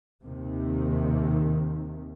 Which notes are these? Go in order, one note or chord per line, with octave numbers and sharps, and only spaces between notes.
D#2 C3 D#3